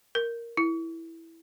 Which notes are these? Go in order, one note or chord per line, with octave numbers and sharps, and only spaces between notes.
A#4
E4